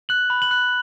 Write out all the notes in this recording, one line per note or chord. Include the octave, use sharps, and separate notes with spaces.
F#6 F#7
B5
F#7
F#6